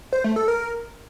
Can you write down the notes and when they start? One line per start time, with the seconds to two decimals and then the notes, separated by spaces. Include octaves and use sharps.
0.13 C5
0.24 A3
0.36 A4
0.48 A#4